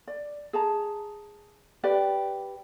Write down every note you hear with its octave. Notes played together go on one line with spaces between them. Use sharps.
D5
G#4 A5 A#5
G4 B4 D5 G5